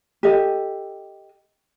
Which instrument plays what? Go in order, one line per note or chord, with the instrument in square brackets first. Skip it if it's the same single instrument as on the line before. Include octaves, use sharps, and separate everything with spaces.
[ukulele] G4 A4 D#5